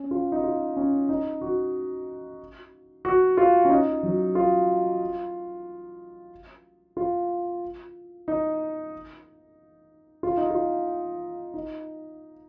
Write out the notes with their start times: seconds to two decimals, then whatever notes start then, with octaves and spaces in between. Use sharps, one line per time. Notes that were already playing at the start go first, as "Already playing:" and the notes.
Already playing: C#4
0.11 F4
0.32 D#4
0.44 F4
0.76 C#4
1.09 D#4
1.41 F#4
3.05 F#4
3.37 F4
3.65 C#4
3.70 D#4
4.03 F#3
4.35 F4
6.97 F4
8.28 D#4
10.23 F4
10.37 D#4
10.51 F4
11.54 D#4